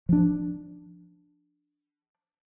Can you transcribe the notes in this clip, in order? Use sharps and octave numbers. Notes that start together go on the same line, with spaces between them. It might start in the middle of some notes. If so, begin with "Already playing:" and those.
F3 D4